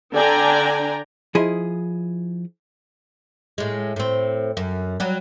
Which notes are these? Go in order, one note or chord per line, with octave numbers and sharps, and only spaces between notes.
D3 D4 D5 G5 G#5 A#5
F3 E4 G#4 D#5
A2 G#3
A2 C4
F#2
F#3 G3